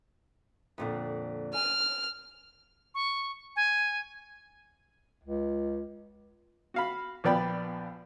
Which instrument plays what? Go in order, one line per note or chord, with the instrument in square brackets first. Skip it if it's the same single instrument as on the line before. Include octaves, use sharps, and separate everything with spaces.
[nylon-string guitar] F2 A#2 D3
[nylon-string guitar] G#5 [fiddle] F6
[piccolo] C#6
G#5
[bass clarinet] C#2
[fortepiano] F#4 F5 B5
A#1 F3 B3 D5 G5 B5